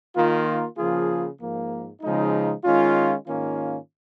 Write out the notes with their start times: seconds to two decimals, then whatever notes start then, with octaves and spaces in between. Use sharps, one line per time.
0.15 D#3 A#3 F4
0.77 C#3 F3 A#3 F4 G#4
1.40 G#2 F3 A#3
2.02 C#3 F3 G#3 D#4
2.64 D#3 G#3 C#4 F4
3.27 G#2 D#3 A#3 C#4 F4